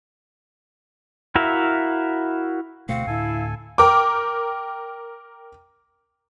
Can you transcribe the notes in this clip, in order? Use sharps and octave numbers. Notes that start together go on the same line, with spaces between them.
E4 F#4 A#4 E5 F5
D2 B2 A3 C4 F#4 F5 F#5
D2 A2 E4 A4 G#5
A#4 G5 D6